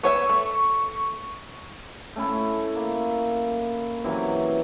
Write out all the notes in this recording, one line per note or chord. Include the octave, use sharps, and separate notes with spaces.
B3 C#5 E5 C#6
A3
A3 C#4 E4 A4
A#3
C3 E3 F#3 C#4